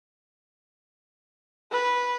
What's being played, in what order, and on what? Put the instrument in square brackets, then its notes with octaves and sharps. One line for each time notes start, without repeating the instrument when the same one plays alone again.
[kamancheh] B4